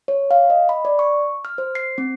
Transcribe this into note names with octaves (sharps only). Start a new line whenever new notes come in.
C#5
F5
D#5
B5
D5
C#6
F6
C5
C7
C4